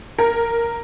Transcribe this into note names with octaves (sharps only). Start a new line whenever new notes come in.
A#4